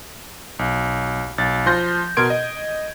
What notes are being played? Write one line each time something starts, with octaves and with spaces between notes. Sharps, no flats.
B1
B1 A6
F3 C6 G6 A#6
B2 A#4 C6 G#6 D7
D#5